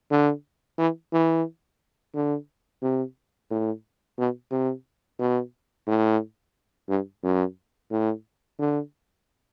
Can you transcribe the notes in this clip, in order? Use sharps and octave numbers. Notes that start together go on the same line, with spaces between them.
D3
E3
E3
D3
C3
A2
B2
C3
B2
A2
G2
F#2
A2
D3